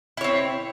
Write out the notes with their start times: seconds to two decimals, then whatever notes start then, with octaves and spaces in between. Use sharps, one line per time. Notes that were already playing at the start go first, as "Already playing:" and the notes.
0.17 E4
0.21 C#5
0.24 C4